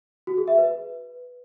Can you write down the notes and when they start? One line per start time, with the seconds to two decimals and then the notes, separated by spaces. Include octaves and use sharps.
0.27 F#4
0.37 G#4
0.48 E5
0.58 B4